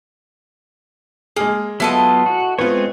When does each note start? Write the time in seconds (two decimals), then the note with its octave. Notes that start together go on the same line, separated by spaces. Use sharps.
1.36 G#3 A#3 G#4
1.80 F#3 B3 E4 F4 A4 D#5
2.26 F#4
2.59 G#3 B3 C4 F4 C#5